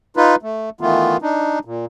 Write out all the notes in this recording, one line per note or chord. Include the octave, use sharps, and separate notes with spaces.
D#4 F4 B4
A3
D#3 E3 A3 B3 F4
D4 D#4
A#2